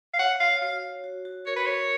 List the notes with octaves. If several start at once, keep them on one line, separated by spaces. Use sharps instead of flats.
F5
C#5 F#5
C#5 F5
F#4 F5
C#5
F#4
F#4
A#4 C#5
B4
A#4 C#5